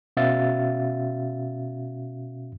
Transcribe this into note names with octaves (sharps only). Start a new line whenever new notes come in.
B2 C#4 F#4 E5 F5 A6